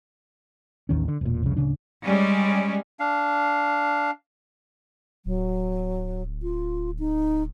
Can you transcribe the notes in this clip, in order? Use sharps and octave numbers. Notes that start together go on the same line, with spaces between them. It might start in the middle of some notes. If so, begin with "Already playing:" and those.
A1 D#2 D#3 C#4
D3
E1 A#2
C2 F2 C#3
D1 C#3 D4
G3 G#3 C#4
D4 F5
D1 F#3
F4
D#4